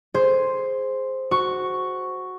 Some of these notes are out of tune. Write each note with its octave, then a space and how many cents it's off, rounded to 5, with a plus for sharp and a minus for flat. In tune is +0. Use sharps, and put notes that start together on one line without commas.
G#4 +5 C5 +0
F#4 +0 C#6 +5